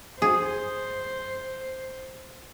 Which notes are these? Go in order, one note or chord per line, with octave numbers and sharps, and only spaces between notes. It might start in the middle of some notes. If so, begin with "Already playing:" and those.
G#4 C5